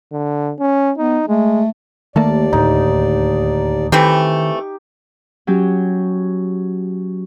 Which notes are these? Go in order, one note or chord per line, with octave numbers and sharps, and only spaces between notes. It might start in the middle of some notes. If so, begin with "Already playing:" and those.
D3
C#4
B3 D#4
G#3 A3
D#2 D#3 A3 A#3 D5 A5
D2 A2 D#4
D#3 E3 A3 C4 G4
F#3 C#4 G4